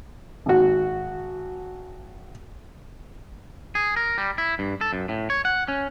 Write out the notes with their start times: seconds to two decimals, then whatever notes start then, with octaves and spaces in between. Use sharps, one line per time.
0.46 G#1 F#4
3.75 G#4
3.97 A#4
4.18 G3
4.38 E4
4.59 G2
4.81 A4
4.93 F#2
5.09 A2
5.30 C#5
5.45 F#5
5.68 C#4